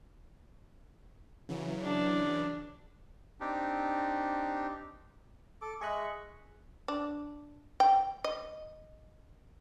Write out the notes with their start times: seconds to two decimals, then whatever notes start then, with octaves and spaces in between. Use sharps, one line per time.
1.49 C#3 E3 F#3
1.82 D4
3.40 C4 D4 D#4 G4
5.62 A4 D6
5.81 G#3 G#4 D#5 E5 C#6 F#6
6.88 D4
7.80 G5
8.24 D#5